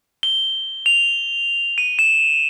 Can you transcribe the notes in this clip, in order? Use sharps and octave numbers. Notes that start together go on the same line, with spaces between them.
G7
F7
D#7
E7